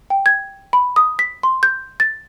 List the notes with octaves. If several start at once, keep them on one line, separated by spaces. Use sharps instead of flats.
G5
G#6
B5
D#6
B6
C6
G6
A6